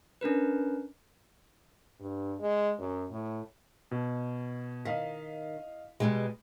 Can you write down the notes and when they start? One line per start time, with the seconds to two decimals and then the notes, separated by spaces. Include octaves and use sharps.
0.21 C#4 D4 A#4 B4
1.99 G2
2.39 G#3
2.79 F#2
3.11 A2
3.91 B2
4.85 D#3 D#5 F5 B6
6.00 B2 G3 G#3